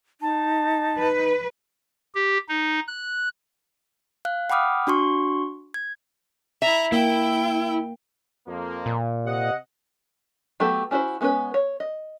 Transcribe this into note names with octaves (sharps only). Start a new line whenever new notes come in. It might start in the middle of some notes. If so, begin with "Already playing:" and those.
D#4 A5
B4
G4
D#4
F#6
F5 F#6
F#5 G5 B5 D6 D#6 F6
D4 F#4 C6 C#6
G#6
E4 E5 A#5
A#3 E4 G5
F2 F3 A#3
A#2
C3 D#5 F#5
F#3 A3 B3 G4 A4
C#4 D4 E4 F#4 C5
G#3 B3 C#4 A4 B4
C#5
D#5